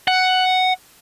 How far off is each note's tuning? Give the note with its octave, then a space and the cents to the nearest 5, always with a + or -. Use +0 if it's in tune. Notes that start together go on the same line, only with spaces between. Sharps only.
F#5 +5